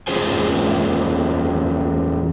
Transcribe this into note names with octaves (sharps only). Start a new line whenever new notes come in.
E2 C#4 F4 G#4 C5 G#5